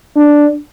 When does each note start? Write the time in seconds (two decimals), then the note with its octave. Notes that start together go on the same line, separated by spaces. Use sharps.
0.16 D4